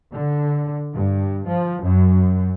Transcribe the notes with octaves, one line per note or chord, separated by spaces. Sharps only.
D3
G2
F3
F#2